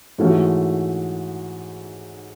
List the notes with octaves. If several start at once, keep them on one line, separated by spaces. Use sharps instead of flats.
G#2 E3 A3 C#4 F#4